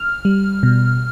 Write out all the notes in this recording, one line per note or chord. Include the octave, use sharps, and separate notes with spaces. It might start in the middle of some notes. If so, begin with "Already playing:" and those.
Already playing: F6
G3
B2